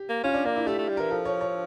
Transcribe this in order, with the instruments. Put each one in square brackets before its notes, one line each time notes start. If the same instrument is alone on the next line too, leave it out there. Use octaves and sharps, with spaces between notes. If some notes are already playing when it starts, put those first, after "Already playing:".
Already playing: [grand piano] G4
[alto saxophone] A#3
[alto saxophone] C#4 [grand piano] F4
[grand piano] D4
[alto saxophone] A#3 [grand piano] D4
[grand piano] E4
[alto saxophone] A3 [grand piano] G4
[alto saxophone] A3
G3
[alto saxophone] E3 [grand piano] A#4
[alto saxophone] F3 [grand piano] A4
[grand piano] C#5
C#5